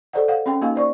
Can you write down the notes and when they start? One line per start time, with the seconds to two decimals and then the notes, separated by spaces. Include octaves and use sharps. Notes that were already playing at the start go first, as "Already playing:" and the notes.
0.13 G#4 A4 C5 D5 D#5 F#5
0.28 F5 F#5
0.46 C4 C#4 G#4 G5
0.62 A#3 D#4 F#4 D#5 F5
0.76 C5 D5 C#6